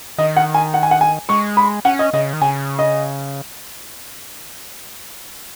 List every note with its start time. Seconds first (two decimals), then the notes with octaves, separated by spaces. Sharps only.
0.18 D#3 D#5
0.36 F#5
0.54 G#5
0.74 F#5
0.83 G#5
0.91 F#5
1.01 G#5
1.29 G#3 C#6
1.57 B5
1.85 C#4 F#5
1.99 D#5
2.13 C#3 D#5
2.33 D#3
2.41 C#3 G#5
2.79 D#5